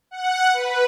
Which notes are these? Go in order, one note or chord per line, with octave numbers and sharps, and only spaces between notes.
F#5
B4